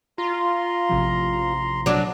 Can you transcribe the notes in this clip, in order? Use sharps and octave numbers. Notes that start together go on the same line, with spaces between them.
F4 A#5 C6
A1 C3 F3
F#3 D4